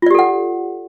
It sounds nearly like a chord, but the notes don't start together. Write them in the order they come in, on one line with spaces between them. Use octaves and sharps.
F4 D5 G4 A4 F#5